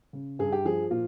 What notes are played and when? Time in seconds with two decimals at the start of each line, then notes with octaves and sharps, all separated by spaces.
0.13 C#3
0.39 G2 G#4
0.52 G4
0.65 F3 G#4
0.90 A#2 F4